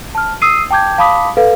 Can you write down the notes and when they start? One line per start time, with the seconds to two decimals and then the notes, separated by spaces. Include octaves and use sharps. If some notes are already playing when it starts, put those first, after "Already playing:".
0.15 A5 F6
0.42 D#6 E6 C7 D#7
0.71 G5 A5 D6 G6 G#6
0.98 F5 A5 B5 D6 D#6 B6
1.37 A4 B4 F5